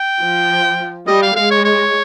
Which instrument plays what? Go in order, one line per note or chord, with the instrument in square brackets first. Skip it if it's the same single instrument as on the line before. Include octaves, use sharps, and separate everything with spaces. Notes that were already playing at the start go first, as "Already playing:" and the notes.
Already playing: [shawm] G5
[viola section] F3
[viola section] G3 [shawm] D#5
[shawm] F5
[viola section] G#3 [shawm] F5
[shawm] C#5
C#5